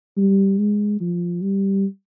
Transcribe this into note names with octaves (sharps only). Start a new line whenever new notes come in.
G3
G#3
F3
G3